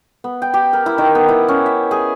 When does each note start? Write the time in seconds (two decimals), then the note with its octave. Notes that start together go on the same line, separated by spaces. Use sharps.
0.24 B3
0.42 G5
0.54 G4
0.73 A#4
0.86 E4
0.98 D#3
1.15 B3
1.29 E4
1.49 C#4
1.66 E5
1.91 G#4